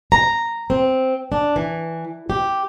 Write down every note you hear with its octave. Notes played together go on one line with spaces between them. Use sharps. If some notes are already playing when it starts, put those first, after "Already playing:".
A#5
C4
D4
E3
G4